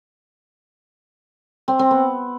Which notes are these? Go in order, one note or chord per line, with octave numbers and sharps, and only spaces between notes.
C4
C4
B3